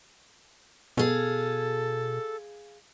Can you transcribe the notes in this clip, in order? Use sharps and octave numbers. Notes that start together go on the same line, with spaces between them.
B2 G#4 A4 F5